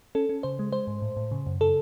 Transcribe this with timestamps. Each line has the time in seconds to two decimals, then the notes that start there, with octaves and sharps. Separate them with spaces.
0.15 C#4 A4
0.29 C#4
0.43 C#3 C5
0.59 G#3
0.73 G#3 C5
0.87 G#2
1.02 A2
1.17 A2
1.32 C#3
1.46 F#2
1.61 C#3 A4